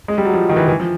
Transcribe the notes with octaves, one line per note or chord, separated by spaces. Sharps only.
G#3
G3
F#3
F3
D#3
E3
E3
F3